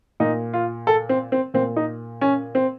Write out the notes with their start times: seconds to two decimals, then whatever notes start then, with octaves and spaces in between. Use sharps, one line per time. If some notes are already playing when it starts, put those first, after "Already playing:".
0.20 A#2 D#4
0.54 F4
0.87 A4
1.09 C4
1.32 C4
1.54 A#2 C4
1.76 D#4
2.21 C#4
2.55 C4